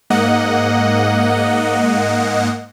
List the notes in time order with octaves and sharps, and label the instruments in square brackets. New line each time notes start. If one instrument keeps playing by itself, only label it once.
[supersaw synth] G#2 A#3 D#5 F#5